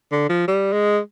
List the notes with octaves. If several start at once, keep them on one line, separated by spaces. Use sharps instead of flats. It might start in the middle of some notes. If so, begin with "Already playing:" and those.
D3
F3
G3
G#3